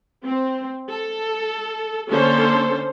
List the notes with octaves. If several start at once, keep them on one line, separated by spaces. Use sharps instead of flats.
C4
A4
D3 A#3 C#4 A4 C5